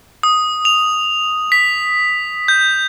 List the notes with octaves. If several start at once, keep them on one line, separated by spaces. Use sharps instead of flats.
D#6
F7
B6
G6